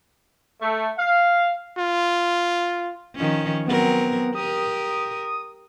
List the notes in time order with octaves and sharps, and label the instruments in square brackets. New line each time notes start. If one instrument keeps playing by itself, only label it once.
[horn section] A3
F5
[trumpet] F4
[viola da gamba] D#3 F3 C#4
[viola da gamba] F#3 C4 A#4 [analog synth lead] B3
[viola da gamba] G4 A#4 [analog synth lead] D#6